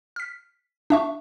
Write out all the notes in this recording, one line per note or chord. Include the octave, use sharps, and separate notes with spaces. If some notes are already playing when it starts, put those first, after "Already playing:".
F6 B6
D4 E5 C#6